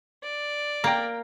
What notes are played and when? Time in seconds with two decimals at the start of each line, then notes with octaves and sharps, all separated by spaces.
0.23 D5
0.84 A#3 G5 A#5